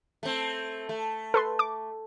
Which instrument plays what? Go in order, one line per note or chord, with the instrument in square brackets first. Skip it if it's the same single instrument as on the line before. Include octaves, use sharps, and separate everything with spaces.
[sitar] A3 C4
A3
[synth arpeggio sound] A4 B4 C6
D6